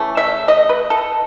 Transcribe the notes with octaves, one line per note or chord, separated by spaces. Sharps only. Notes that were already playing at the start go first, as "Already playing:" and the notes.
Already playing: C#3 E3 A3
E5
D#5
B4
A4